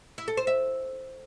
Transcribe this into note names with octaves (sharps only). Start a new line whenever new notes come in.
E4
A4
C5
E5